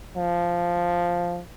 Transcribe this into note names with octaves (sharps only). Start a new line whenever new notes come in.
F3